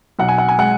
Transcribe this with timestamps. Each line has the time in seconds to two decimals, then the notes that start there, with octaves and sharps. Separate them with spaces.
0.19 B1 F#5
0.28 G#5
0.38 F#5
0.48 G#5
0.58 G#3 F#5